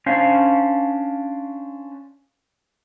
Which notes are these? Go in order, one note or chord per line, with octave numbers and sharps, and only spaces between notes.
C#4 D4 C5 F5